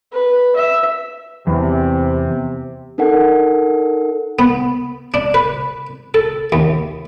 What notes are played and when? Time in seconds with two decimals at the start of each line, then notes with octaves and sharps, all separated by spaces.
0.12 B4
0.56 E5
1.47 E2 C3
2.98 D4 D#4 A4 A#4 F#5
4.39 B3
5.14 D4
5.34 B4
6.14 A4
6.52 D#2